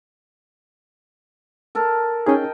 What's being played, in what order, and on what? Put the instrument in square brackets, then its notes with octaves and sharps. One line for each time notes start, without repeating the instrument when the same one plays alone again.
[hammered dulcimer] A4 A#4
[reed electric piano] C#4 D#4 G#4 [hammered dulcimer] D#5 G5